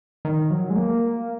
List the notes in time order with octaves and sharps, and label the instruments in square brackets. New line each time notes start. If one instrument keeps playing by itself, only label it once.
[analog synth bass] D#3
F#3
G#3
A#3